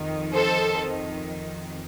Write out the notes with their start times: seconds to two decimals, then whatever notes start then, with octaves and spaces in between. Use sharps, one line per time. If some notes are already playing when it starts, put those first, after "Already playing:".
Already playing: F2 D#3
0.34 A4 C5